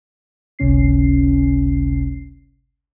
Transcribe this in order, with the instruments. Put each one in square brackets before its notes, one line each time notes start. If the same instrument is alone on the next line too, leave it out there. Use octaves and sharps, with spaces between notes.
[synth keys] G1 C#2 C3 C#4 C7